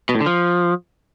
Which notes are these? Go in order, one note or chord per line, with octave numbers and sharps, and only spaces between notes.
B2
A2
D3
F3